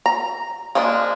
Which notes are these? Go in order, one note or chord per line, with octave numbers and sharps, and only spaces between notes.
A#5
F3 G#3 A#3 D4